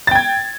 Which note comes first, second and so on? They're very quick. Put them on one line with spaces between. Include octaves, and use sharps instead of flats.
A6 G5 G#6